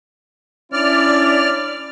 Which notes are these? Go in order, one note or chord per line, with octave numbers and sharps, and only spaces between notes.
C#4 D4 E4 D5 F6